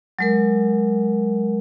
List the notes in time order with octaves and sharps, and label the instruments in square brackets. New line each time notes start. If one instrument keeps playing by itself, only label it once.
[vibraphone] F#3 G#3 A#4